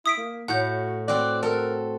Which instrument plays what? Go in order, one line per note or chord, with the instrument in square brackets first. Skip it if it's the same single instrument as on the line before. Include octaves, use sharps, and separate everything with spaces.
[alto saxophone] E4 [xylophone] D#6 B6 D7
[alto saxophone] A#3
[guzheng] A2 [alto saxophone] F#4 [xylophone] F#5 G6
[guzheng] C4 F#4 [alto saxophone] D5
[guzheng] A4 [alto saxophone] A#4